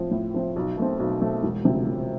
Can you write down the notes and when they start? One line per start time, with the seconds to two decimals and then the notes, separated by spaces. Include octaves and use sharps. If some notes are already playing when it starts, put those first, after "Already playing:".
Already playing: A2 F3 C4
0.11 A2
0.34 F3 C4
0.56 B1
0.77 B2 A3 C4
0.99 B1
1.21 B2 A3 C4
1.43 E1
1.65 D2 C3 F3
1.87 E1